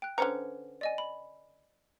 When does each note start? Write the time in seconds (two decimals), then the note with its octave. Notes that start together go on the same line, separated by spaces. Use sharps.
0.02 G5 F#6
0.18 D3 C#4 B4 C5 A#5 C#7
0.81 D5 D#5 G#5
0.98 B5